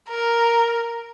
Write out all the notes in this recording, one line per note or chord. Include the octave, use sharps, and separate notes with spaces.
A#4